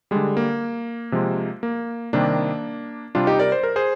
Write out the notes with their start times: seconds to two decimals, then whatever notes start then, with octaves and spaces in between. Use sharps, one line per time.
0.11 D3 G3 G#3
0.37 A#3
1.12 C3 F3 G#3
1.63 A#3
2.13 C3 D#3 G3 A#3 D4
3.15 C3 G3 D4 F4
3.27 D#4 G4
3.39 A#4 D5
3.52 C5
3.63 A#4
3.76 G#4 C5